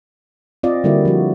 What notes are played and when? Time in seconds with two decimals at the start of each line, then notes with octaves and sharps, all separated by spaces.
0.63 C4 F4 D5 D#5 F5
0.84 D3 G3 A#3 E4 F#4
1.05 F3 F#4